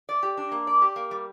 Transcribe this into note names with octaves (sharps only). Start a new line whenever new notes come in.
D5
G4
D4
A#3
D5
G4
A#3
G3